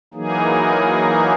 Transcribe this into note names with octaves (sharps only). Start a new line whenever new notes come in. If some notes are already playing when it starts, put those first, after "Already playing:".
E3 F#3 A#3 D#4 G#4